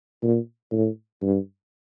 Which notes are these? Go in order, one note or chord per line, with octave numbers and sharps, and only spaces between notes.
A#2
A2
G2